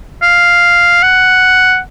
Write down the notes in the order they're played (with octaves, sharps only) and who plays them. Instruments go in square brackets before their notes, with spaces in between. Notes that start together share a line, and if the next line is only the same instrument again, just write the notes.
[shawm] F5
F#5